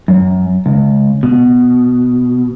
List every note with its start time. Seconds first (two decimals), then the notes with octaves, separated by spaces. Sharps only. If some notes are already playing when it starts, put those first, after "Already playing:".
0.08 F#2
0.66 C#2
1.23 B2